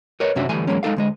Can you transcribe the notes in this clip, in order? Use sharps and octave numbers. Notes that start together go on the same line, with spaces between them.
A#4 B4 C#5 D#5
F#2 C3 C#4 D4 F#4 E5
D2 E3 G3 A3 G#5
E2 F#3 G#3 A#3 C#4
G#3 D#4 A4 F5
D2 G#3 D#5